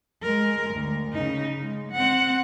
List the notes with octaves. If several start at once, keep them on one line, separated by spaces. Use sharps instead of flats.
G#3 A#4
D2
C#3 D#4
G#3
C4 F#5